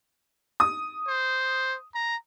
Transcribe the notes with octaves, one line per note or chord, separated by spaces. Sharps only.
D#6
C5
A#5